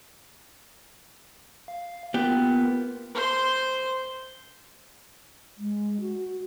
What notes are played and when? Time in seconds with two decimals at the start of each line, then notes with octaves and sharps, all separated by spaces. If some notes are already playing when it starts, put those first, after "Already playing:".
1.68 F5
2.14 A#3 B3 F4 G4 A#4
3.15 C5 C6
5.58 G#3
6.01 F#4